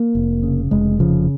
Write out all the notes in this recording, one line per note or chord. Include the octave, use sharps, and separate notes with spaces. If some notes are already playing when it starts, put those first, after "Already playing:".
Already playing: A#3
F1
C#3
F1 G#3
C#3 F3